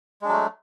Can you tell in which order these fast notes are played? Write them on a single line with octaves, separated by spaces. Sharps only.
G#3 D4 F#3 A3